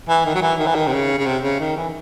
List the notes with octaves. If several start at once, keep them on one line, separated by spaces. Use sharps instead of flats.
E3
D#3
F#3
E3
D#3
E3
D#3
C3
C#3
C#3
C3
C#3
D#3
E3